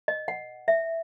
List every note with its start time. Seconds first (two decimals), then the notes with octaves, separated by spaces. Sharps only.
0.08 D#5
0.28 F#5
0.68 E5